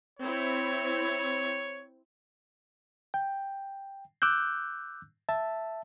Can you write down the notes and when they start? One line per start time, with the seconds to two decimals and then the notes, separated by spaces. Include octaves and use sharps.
0.19 C4 E4 C#5
3.14 G5
4.22 D6 E6 F#6 G6
5.29 E5 A5